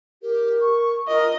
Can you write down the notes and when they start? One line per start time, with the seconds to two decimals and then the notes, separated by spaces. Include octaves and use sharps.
0.22 G4 A#4
0.61 C#6
1.08 F4 A#4 D#5